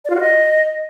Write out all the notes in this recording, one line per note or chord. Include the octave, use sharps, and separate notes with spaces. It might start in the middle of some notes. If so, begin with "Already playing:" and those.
D5
F4
F#4
D#5